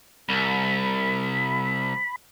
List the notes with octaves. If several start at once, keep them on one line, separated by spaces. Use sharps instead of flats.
C2 B5